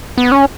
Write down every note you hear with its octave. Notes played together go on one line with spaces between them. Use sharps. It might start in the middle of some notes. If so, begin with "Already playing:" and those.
B3
C#4